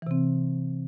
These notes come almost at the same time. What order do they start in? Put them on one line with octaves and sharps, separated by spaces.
E3 C3 C4